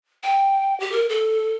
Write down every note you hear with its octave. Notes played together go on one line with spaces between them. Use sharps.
G5
G4
A#4
A4